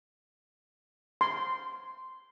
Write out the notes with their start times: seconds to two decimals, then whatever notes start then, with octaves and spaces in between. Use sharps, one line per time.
1.21 C6